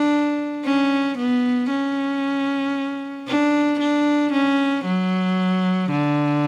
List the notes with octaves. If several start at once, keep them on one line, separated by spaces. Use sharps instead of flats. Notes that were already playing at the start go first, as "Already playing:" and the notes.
Already playing: D4
C#4
B3
C#4
D4
D4
C#4
F#3
D3